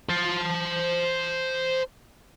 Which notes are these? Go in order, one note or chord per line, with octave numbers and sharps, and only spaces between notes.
C5 A5